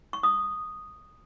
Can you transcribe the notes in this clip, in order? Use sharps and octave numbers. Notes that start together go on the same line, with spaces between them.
C#6
D#6